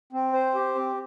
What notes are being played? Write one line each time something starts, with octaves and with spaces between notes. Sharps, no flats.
C4
C5
G4
C4